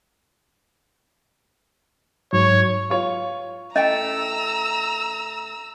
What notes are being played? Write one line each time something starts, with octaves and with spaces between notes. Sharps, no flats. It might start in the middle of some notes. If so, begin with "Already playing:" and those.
G#2 F#3 C#5
F4 C#5
A2 A3 C#4 D#5 G5 A#5 E6